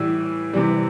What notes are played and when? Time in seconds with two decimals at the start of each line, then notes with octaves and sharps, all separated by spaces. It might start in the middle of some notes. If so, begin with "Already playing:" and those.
Already playing: A2 E3 G3 E6
0.53 C3 E3 G3